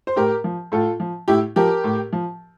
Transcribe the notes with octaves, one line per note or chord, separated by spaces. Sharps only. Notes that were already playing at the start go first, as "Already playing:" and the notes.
C5
A2 G4 A#4
F3
A2 F4 A4
F3
A2 E4 G4
F3 G4 A#4
A2
F3